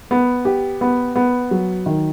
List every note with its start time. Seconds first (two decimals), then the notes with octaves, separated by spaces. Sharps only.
0.11 B3
0.45 G4
0.81 B3
1.16 B3
1.51 F#3
1.86 D#3